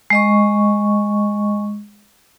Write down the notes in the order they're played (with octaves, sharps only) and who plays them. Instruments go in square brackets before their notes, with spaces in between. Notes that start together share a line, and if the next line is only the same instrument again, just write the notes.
[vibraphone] G#3 D#5 C#6